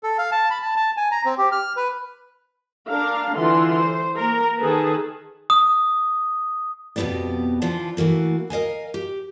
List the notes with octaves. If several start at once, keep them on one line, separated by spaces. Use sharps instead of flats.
A4
F5
A5
B5
A5
A5
G#5
A#5
C4
G4
F6
B4
D4 A#4 F5
D3 E3 F4 C6
C5
A#3 A#4
D#3 G#4 A4 B4 A5
D#6
F2 B2 F#3 B3 G4 D5
D3 E3 F3 D4 F4
E3 A3 A#3 F#4
A#4 D#5 F5 G#5
G4